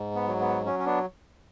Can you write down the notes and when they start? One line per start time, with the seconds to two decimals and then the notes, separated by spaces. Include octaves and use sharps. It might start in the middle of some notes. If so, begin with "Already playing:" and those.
Already playing: G#2
0.15 B3
0.28 F#3
0.41 B3
0.66 F#3 C#4
0.79 C#4
0.86 B3 D4